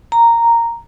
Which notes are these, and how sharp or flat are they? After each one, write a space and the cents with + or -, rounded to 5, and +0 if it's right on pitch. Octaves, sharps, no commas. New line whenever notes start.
A#5 -5